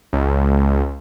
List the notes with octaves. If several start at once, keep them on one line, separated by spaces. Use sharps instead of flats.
C#2